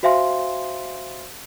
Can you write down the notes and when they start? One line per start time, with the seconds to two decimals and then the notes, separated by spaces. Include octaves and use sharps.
0.03 F#4 C5 E5 F5 G#5 C6